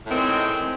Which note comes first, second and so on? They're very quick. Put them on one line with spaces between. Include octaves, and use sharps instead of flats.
A2 D#3 C4 G#3